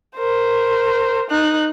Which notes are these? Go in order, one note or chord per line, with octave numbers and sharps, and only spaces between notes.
A#4 C5
D#4 F#6